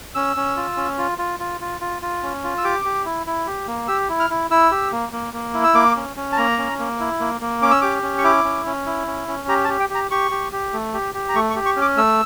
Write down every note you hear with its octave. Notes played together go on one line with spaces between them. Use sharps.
C#4 E6
C#4
F4
C#4
F4
F4
F4
F4
F4
F4
C#4
F4
E6
G4 D6
G4
E4
E4
G4
A#3
G4 E6
E4
F6
E4
E4 E6
G4
A#3
A#3
A#3
E4
E6
A#3 D6
C#4
C#4
A5
A#3 A#5
C#4
A#3
E4
A#3
A#3
C#4 D6
E6
G4 D6
C#4
C#6
E4 D6
C#4
C#4
E4
C#4
C#4
G4 A#5
A5
G4
G5
G4
A#5
G4 C#6
G4
G4
A3
G4
G4
A#5
A3 C#6
C#6
G4
C#6
C#4
D6
A3 E6